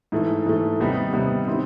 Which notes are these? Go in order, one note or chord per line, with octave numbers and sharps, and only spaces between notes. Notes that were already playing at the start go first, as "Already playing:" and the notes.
G#2 E3 A3
G#2 E3 A3
C3 D#3 G3 B3 D#4
C3 D#3 G3 B3 D#4
D#3 G3 C4 E4